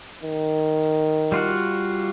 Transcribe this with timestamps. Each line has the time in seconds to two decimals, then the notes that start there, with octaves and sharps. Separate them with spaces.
0.24 D#3
1.32 G3 F4 F#4